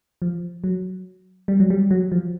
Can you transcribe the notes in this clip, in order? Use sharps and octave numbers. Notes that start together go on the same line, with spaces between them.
F3
F#3
G3
F#3
G3
F#3
F3